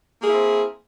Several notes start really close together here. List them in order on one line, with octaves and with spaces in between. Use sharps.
A#3 G#4 E4 C4